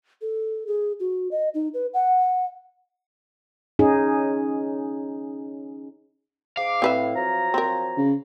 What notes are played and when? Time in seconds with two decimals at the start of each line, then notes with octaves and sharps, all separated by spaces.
0.21 A4
0.67 G#4
1.00 F#4
1.31 D#5
1.54 D#4
1.74 B4
1.94 F#5
3.79 C#4 D#4 G#4
6.57 G#2 F5 D6
6.82 A2 C4 B4 E5
7.16 F3 F#3 A#5
7.54 C4 A#4
7.97 C#3